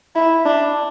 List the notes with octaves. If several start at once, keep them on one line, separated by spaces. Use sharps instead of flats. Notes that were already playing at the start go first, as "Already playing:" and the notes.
E4
D4